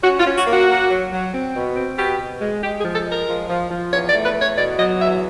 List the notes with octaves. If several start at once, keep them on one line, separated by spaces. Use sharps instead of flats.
C#4 F#4
F4
C#4
F#4
A#3
F#4
A#3
F#3
F#3
C4
B2
C4
B2 G4
B2
G#3
G#3 G4
G#4
F3
A4
G#3
A#4
F3
F3
F3
E2 C#5
D5
A3
B4
E2
C#5
B2 D5
F#3 D#5
E2 E5